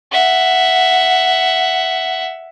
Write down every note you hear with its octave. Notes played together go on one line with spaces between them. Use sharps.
E5 F#5